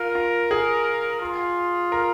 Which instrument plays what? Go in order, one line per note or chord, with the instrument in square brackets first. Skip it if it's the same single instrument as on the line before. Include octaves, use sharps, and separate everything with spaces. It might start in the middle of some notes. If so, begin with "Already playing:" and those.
Already playing: [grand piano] F4 [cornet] A#4
[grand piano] F4
G#4
[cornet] F4
[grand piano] A#4